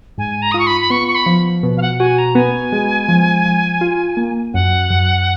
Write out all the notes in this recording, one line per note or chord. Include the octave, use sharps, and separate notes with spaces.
G#2 G#5
A#5
D#6
F4 C#6
B5
B5
B3 C#6
C#6
B5
F3
B2
F5
F#5
F#4 G#5
A#5
B3 G#5
G#3
F3
F3
F4
A#3
F#2 F#5
F#2